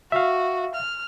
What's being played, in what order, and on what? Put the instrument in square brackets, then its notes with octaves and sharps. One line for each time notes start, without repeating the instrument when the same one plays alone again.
[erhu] F#4 [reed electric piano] E5 F5
[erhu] F6